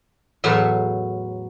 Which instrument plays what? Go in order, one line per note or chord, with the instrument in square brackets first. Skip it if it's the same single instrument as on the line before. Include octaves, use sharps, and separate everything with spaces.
[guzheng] E2 A2 F#3 F5 G#5 A5